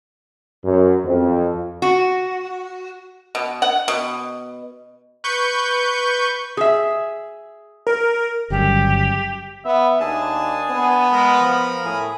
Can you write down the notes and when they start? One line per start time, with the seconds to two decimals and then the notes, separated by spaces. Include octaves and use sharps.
0.65 F#2
1.05 F2
1.82 F#4
3.35 B2
3.62 F#5
3.88 B2
5.24 B4 C#6 G6
6.57 G#4 E5
7.87 A#4
8.50 G1 C#3 F#3 G3 G4
9.65 B3 E5
10.00 D#2 D4 G#4 A5
10.71 B3
11.12 G#3 A#4 A#5 B5
11.41 F3
11.85 A2 G#4